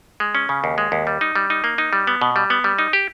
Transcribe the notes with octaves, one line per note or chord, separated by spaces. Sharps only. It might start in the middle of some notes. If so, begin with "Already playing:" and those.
G#3
C#4
C#3
D#2
G#3
D#2
G3
D#4
G3
D#4
A#3
D#4
G3
B3
B2
G3
B3
G3
D#4
G4